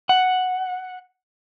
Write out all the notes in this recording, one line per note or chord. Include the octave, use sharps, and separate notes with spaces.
F#5